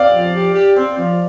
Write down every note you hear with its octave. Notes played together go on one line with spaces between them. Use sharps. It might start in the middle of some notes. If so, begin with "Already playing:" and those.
Already playing: C4 D5 F5
F3
G4
G4
C4
F3